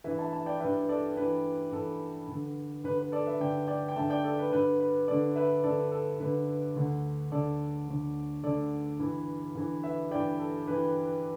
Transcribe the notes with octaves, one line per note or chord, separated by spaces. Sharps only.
G2 E3 B4 E5
E5 A5
E5 A5
D5 G5
G2 E3 B4 E5
A4 D5
G2 E3 B4
G2 E3 A4
G2 D3
G2 D3 B4
B4
A4 D5
B4 E5
G2 D3 D5 G5
D5 G5
G5
G2 D3 E5 A5
D5 G5
A4 D5
B4
G2 D3 B4
B4
G2 D3 A4 D5
B4 E5
G2 D3 A4 D5
A4
G2 D3 B4
D2 D3
D2 D3 A4 D5
D2 D3
D2 D3 A4 D5
G2 E3
G2 E3
B4 E5
G2 E3 D5 G5
A4
G2 E3 B4